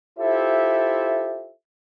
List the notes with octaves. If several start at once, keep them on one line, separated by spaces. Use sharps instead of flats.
E4 F4 G4 A4 C5 E5